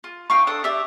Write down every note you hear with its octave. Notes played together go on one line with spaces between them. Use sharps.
F4
D#4 F5 G5 C#6
D4 A4 A5 D#6
G4 D5 E5